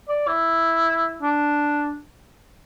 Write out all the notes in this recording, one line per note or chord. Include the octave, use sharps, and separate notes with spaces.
D5
E4
D4